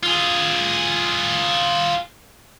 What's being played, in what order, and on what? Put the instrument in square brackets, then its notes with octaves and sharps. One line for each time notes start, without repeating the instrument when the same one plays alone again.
[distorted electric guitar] F4 G#4